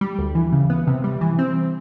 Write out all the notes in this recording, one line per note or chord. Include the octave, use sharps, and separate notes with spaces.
G3
D2
E3
C#3
B3
C3
G3
E3
C4